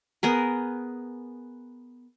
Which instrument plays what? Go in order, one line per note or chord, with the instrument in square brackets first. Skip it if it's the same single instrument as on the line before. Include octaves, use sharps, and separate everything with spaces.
[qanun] B3 G#4 A#4